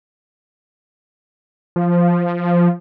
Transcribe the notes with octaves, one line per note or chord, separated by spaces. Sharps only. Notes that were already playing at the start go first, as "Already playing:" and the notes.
F3